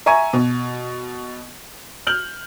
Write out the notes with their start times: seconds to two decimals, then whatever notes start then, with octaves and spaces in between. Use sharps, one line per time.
0.06 E5 G#5 A#5 C#6 G#6 D#7
0.33 B2
2.07 F6 G6 F#7